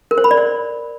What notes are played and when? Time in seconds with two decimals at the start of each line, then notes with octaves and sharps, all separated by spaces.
0.11 A#4
0.18 C5
0.24 B5
0.31 D5
0.37 C5